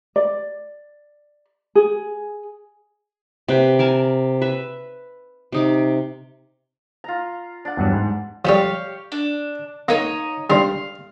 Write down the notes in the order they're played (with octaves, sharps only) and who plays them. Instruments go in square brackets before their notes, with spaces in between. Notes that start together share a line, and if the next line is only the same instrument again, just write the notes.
[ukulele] D5
G#4
[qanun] C3 B4 G5
A#4 G#5 A5
B4 E5
C3 D#4 D6
[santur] F4 A#5
D4 F#5
[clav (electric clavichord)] E2 G2 F#3
G#2
[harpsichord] F3 G3 [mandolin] G4 C#5 F5
[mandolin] D4
[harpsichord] A#3 [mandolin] D#4 C#5 D#5
[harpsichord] G3 D4 C5 [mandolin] F5